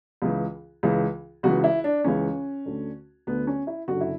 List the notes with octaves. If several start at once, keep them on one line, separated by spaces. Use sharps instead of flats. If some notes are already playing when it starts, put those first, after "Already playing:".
C#2 C#3 E3
C#2 C#3 E3
C#2 C#3 E3 F#4
E4
D4
C#2 C#3 E3 C#4
D2 D3
D2 D3 B3
C#4
E4
F#1 F#2 D3 F#4
E4